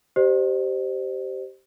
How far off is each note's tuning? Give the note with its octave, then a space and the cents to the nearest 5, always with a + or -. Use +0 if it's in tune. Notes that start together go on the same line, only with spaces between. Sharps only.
G4 -20 C5 +0 D#5 -45